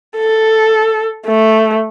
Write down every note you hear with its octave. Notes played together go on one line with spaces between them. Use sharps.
A4
A3